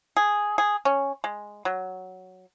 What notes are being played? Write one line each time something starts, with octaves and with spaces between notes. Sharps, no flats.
G#4
G#4
C#4
G#3
F#3